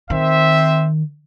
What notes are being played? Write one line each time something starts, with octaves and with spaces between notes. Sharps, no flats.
D#3 C4 C5 E5